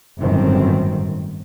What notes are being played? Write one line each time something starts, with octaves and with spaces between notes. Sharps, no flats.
G1 F#2 A2 D#3 C4